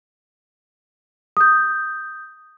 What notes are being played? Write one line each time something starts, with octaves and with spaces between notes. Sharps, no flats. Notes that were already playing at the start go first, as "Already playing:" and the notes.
D#6 G6